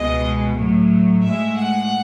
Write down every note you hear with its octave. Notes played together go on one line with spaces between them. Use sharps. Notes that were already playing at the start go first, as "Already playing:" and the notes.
Already playing: C#2 B2 G#3 D#5
A2 F#3
A2 G#3 E5
F#5